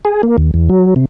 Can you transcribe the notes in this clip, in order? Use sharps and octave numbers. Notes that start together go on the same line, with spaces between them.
G#4
A#3
D#2
E2
F#3
C3